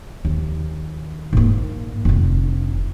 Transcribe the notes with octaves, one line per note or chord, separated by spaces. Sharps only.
D#2
G#2 A#3
F1 D3